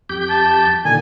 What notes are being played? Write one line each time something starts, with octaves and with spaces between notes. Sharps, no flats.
F2 G4 G6
A5
A#2 D3 D#3 G#5